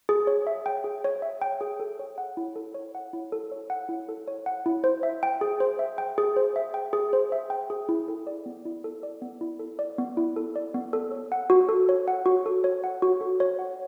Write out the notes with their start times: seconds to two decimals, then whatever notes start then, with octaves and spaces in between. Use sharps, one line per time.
0.09 G#4
0.27 C#5
0.47 E5
0.66 G5
0.84 G#4
1.04 C#5
1.22 E5
1.42 G5
1.61 G#4
1.80 A4
1.99 C#5
2.18 F#5
2.37 E4
2.56 A4
2.74 C#5
2.95 F#5
3.13 E4
3.32 A4
3.52 C#5
3.70 F#5
3.89 E4
4.09 A4
4.28 C#5
4.46 F#5
4.66 E4
4.84 C5
5.03 E5
5.23 G5
5.41 G#4
5.60 C5
5.79 E5
5.98 G5
6.18 G#4
6.36 C5
6.56 E5
6.74 G5
6.93 G#4
7.13 C5
7.32 E5
7.50 G5
7.70 G#4
7.89 E4
8.08 A4
8.27 D5
8.46 B3
8.65 E4
8.84 A4
9.03 D5
9.22 B3
9.41 E4
9.59 A4
9.79 D5
9.98 B3
10.17 E4
10.36 A4
10.56 D5
10.74 B3
10.93 A4
11.11 C#5
11.32 F#5
11.50 F#4
11.69 A4
11.89 C#5
12.08 F#5
12.26 F#4
12.46 A4
12.64 C#5
12.84 F#5
13.02 F#4
13.21 A4
13.40 C#5
13.59 F#5